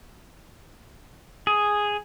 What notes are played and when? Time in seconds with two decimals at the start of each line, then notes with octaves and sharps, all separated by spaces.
1.47 G#4